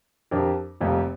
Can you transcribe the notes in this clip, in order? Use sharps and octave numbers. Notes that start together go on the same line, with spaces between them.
F2 F3 D4 G4 A#4
F1 F2 C3 G3 A#3